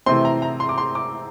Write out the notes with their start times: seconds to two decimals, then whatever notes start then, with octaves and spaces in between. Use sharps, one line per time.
0.06 C3 E3 A3 C4 C6
0.25 A#5
0.42 A#5
0.60 C6
0.69 D6
0.78 C6
0.95 D6